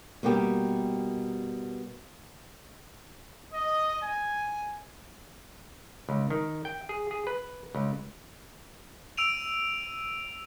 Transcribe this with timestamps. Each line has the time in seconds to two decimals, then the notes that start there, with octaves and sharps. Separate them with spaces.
0.23 B2 G3 A#3 B3 G4
3.53 D#5
4.03 G#5
6.09 C#2
6.30 D#3
6.65 G5
6.89 G#4
7.11 G#4
7.27 B4
7.75 C#2
9.17 E6 D7 D#7 F7